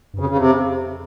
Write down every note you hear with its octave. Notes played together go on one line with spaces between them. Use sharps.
G2
F2 C#3
C#3
C3